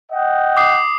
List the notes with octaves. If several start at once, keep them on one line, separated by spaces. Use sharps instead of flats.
D#5 F#5 G5
D6 D#6 C7